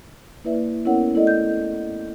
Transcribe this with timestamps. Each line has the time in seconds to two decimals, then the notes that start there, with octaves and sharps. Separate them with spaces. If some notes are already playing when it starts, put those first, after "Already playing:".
0.44 A#3 E4 B4 D5 E5
0.85 B3 C#4 E4 A#4 C#5 F#5
1.14 A3 E4 A4 D5 D#5
1.27 G6